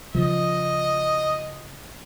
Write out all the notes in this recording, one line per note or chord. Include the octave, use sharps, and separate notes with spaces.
C#3 F3 D#5